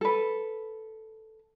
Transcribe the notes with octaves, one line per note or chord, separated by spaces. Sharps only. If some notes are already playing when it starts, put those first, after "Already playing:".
A4 B4